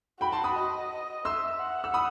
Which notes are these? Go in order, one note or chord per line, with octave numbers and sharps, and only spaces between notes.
F#4 G5 B5
A5 C6
B5 D#6
D#5
E5 C6 E6
F#5
E6
B5 D#6